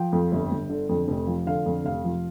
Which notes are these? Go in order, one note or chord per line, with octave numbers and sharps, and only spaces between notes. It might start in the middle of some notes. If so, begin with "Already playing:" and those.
Already playing: F3 G5
F2
G1
G1
D3
F2
F1
F3
D3 F5
F2
F1 F5
F3